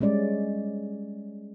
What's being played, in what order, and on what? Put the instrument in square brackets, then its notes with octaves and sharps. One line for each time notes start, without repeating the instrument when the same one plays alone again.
[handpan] G3 G#3 C#4 D5